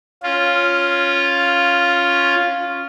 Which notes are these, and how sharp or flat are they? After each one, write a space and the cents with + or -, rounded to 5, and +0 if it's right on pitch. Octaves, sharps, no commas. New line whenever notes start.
C#4 +0 F4 +0